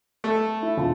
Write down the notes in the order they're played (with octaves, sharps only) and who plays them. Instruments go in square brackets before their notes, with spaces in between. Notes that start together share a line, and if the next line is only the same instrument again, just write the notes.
[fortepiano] A3 A4
[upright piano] E4
E1 F4 A5